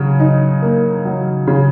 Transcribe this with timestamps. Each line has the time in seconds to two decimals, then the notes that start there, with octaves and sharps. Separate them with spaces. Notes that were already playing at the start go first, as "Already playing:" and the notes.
Already playing: C#3 F#3
0.20 D#4
0.62 A#3
1.05 F#3
1.47 C#3